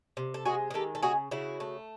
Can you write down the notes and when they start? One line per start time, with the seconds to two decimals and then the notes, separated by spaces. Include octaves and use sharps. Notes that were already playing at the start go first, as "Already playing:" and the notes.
0.17 C3
0.34 A4
0.45 G#3 F#4 G#4
0.71 G#4
0.74 D#3 G4 A4
0.95 A4
1.03 C#3 F#4 G#4
1.31 C#3 E4 F#4
1.60 A3